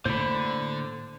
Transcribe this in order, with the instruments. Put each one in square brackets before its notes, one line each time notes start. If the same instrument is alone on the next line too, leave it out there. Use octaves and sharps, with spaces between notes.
[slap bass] A2 A#3 [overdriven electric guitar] D3 [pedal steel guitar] C5 B5